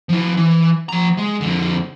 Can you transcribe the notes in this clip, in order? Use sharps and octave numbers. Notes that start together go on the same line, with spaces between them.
F3 E4
E3
F3 A#5
G#3
F2 D3